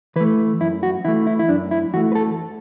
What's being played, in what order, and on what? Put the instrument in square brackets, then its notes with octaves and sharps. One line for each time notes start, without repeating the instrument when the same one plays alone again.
[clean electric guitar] E3 B4
A3
F#2 E4
F#4
E3 A3 E4
E4
E4
F#2 D4
E4
E3 F#4
A3
B4
A4